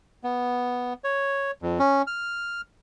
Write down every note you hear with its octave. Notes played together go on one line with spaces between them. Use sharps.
B3
C#5
F2
C#4
F6